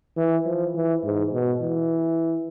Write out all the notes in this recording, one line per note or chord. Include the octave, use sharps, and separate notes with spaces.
E3
F3
E3
G#2
B2
E3